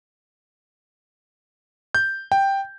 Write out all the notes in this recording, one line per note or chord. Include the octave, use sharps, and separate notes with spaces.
G6
G5